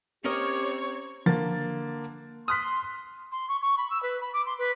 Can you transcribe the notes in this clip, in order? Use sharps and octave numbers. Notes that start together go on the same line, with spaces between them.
C4 C#4 G4 A#4 C#5 D#5 C#6
D3 F3 A#3 A6
C6 D#6 F6 F#6 B6
C6
C#6
C#6
B5
E6
B4
B5
D6
C6
B4